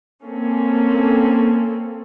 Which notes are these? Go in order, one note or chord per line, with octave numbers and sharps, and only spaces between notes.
A#3 C4 C#4 A4